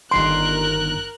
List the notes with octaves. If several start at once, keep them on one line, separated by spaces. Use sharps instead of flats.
G1 D#3 A#4 C6 F#6 D7